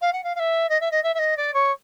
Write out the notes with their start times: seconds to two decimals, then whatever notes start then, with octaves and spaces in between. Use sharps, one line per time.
0.01 F5
0.12 F#5
0.23 F5
0.35 F5
0.39 E5
0.69 D#5
0.80 E5
0.91 D#5
1.03 E5
1.14 E5
1.19 D#5
1.37 D5
1.53 C#5